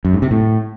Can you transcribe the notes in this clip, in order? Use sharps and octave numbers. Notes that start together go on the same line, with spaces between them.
F#2
G#2
C3
A2